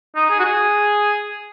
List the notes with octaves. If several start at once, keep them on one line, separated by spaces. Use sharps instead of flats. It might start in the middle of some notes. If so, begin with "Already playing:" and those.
D#4
G#4
F#4
G#4